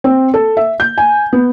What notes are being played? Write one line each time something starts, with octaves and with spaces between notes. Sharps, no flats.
C4
A4
E5
G6
G#5
B3